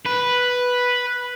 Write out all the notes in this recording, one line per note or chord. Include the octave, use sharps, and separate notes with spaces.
B4